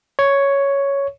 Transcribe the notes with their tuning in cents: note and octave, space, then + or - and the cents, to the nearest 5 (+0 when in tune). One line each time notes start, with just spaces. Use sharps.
C#5 +5